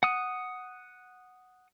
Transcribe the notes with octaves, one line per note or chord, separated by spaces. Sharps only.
F#5 D#6